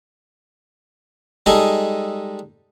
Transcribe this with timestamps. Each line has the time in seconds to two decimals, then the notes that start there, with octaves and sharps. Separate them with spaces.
1.46 G3 G#3 D#4 G#4 A4